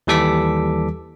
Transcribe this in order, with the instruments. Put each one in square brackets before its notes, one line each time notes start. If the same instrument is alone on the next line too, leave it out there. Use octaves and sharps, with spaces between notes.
[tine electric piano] D#2 E3 G3 A4 D6 B6